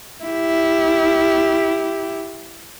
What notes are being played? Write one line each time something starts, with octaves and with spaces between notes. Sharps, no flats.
E4 G4